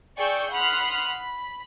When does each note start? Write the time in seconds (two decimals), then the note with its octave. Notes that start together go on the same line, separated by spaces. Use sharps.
0.18 G#4 D5 G5 C#6 E6 G6
0.52 F#5 B5 C6 D#6 F6 F#6
1.09 B5